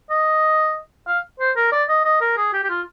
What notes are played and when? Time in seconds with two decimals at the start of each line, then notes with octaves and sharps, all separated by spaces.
0.10 D#5
1.07 F5
1.40 C5
1.56 A#4
1.72 D5
1.89 D#5
2.05 D#5
2.21 A#4
2.37 G#4
2.53 G4
2.64 G4
2.69 F4